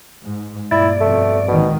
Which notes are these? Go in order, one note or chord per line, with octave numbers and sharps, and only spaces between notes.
G#2
G2 A#2 E4 D5
F2 B2 A3
A#1 G#2 B2 D#3